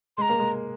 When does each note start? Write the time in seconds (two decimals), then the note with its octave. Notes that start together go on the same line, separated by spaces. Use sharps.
0.17 G#3 A#5 C6
0.29 A#3
0.39 G#3